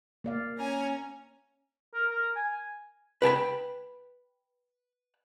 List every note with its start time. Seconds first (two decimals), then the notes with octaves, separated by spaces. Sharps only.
0.24 A#3 D5 F5
0.58 C#4 G#5 A#5
1.94 A#4
2.11 A#4
2.36 G#5
3.22 B4 G5 G#5 B5